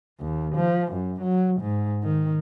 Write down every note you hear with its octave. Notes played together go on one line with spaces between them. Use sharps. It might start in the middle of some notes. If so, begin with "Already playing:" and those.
D#2
F3
F#2
F#3
G#2
D#3